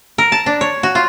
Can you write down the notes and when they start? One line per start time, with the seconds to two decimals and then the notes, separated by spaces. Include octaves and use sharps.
0.18 A#4
0.32 A5
0.46 D4
0.61 C#5
0.83 F#4
0.95 F4